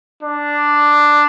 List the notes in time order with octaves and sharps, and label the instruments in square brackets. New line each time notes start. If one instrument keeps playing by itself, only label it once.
[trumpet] D4